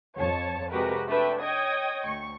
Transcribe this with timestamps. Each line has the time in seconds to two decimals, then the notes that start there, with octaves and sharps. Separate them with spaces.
0.16 F2 C#5 A5
0.70 C3 G#3 F#4 G4 A#4 B4
1.08 A3 D4 B4 E5 G5
1.40 C#5 D#5 G5 D#6 G#6
2.05 D2 C#6